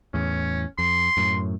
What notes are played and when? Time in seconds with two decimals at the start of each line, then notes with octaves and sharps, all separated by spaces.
0.14 E2 A2 C#4
0.79 F2 C6
1.17 F#2 A2